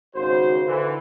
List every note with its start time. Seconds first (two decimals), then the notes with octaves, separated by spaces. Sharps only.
0.16 G#1 C#3 F#4 C5
0.67 D3 E3